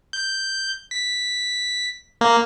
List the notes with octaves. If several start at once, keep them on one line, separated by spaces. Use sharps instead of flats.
G6
B6
A#3